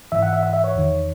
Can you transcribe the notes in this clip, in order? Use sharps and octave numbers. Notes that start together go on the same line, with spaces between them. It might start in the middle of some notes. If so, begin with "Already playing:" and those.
G#2 E3 E5
F#5
E5
E5
E5
C#5
E2 D#3